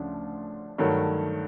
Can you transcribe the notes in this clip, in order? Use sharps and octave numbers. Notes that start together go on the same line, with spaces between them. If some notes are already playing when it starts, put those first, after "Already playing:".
Already playing: D2 C#3 F3 D4
G2 D#3 F#3 A3